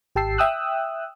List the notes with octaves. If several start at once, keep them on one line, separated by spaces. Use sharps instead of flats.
G#1 G4 G5 A5 E6 C7
E5 G5 D#6 E6 F#6